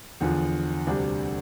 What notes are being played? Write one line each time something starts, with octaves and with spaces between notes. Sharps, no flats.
E2 D3 F3
D2 C3 G3 D4